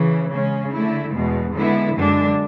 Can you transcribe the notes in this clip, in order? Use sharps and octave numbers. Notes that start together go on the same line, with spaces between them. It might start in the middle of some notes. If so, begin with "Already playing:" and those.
Already playing: C#3 E3
C#3 G#3 C#4
D3 A3 E4
E2 B2 G#3
D3 G#3 B3 E4
F#2 D3 G#3 D4